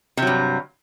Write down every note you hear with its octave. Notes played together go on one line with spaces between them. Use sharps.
G2 C3 F#3